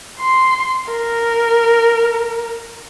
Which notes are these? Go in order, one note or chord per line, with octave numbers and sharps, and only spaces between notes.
C6
A#4